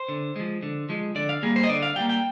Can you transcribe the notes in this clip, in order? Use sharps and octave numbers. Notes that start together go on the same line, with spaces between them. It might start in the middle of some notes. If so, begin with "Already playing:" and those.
Already playing: C5
D3
F3 G#3
D3
F3 G#3
D3 D5
F5
G3 A#3 G#4
C5
D#5
D3 D5
F5
G3 A#3 G5
G5